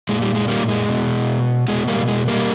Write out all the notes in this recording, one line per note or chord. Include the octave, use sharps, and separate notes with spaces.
A#2 G#3
G3
G#3
G3 A#3
G#3
B2
B2 G#3
G3 A#3
G#3
G3 A#3